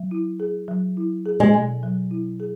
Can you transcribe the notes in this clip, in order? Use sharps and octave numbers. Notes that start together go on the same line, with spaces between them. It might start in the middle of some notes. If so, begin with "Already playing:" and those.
Already playing: F#3
E4
G#4
F#3
E4
G#4
G#3
B2
F#3
E4
G#4